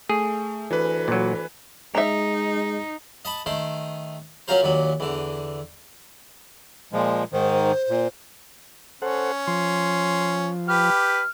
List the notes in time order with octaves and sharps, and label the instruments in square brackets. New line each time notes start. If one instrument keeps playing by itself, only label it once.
[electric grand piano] A3 [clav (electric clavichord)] G#4
[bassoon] D2 [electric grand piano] E3 B4
[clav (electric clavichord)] A#2 F#3
[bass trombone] G#3 [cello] D#4 [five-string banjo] E5 A#5
[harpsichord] D#5 A5 B5
D#3 A3 C5
F#3 C#4 F4 A#4 C5
D#2 A#2 F#3
E2 D3
[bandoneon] A#2 F3 G#3
[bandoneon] G#2 D#3 [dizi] C5
[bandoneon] A#2
[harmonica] C#4 [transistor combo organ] A4 C5 F#5
[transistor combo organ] F3 [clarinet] C6
[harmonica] G4 B4 [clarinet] F6